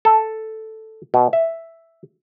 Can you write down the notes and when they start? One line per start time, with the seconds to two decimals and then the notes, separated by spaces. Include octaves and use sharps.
0.05 A4
1.14 B2
1.33 E5